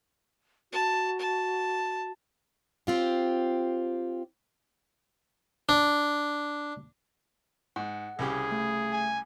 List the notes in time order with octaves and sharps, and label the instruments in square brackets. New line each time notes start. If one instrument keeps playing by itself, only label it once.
[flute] F#4 [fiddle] A5
[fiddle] A5
[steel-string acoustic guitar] C4 F4 G4
[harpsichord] D4
[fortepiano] G#2 [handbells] F#5
[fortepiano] C2 C#3 G4 [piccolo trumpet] G#4
[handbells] A3
[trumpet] G#5